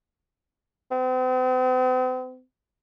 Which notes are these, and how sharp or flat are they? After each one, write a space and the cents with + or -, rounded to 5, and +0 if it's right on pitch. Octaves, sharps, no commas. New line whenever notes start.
C4 -45